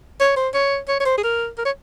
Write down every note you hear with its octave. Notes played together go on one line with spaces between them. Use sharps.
C#5
C5
C#5
C#5
C#5
C5
G#4
A#4
A#4
C#5